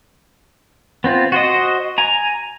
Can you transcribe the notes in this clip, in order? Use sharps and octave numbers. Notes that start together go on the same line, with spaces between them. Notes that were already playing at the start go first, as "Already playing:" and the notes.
B3 C4 F4
F#4 C5 D#5
G#5 A#5